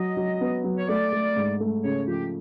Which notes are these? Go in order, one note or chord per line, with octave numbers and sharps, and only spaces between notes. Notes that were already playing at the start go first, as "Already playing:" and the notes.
Already playing: F#3 D#5
F#3
B3
F#3
C#5
A3 D5
A3
G#2
A3
C#3 C#5
F3 G4